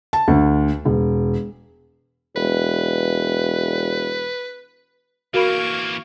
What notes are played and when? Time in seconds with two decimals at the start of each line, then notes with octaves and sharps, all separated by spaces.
0.13 A5
0.28 D2
0.85 E1
2.36 E1 B4
5.34 E3 A#3 F#4 A#4 F5 B5 C#6